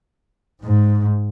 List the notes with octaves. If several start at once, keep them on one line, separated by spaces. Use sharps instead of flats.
G#2